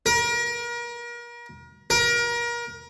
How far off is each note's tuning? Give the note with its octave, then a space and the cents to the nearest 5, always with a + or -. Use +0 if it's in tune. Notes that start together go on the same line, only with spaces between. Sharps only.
A#4 +35
A#4 +30